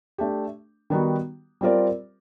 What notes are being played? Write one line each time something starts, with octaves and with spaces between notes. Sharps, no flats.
A3 D4 G4
D#3 G3 B3 D#4 F#4
G3 C4 F4 A#4 D5